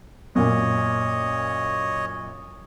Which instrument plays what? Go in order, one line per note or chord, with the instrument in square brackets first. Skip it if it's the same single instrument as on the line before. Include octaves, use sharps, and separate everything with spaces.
[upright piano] F#2 A#2 [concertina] C#5 D#5